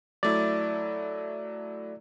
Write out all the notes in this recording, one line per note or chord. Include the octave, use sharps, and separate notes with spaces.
F#3 A3 E4 D5